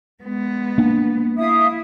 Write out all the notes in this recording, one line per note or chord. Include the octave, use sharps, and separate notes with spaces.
G#3 B3
A#3 D4
E4 E5 F5 D#6